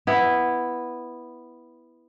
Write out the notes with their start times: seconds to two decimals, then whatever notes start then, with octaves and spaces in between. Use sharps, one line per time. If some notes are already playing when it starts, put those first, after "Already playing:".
0.07 B3 E4